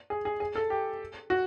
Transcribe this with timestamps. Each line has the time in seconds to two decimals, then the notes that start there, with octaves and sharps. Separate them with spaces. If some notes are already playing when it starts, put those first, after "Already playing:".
0.10 G#4
0.25 G#4
0.40 G#4
0.55 A4
0.70 G4
1.30 F#4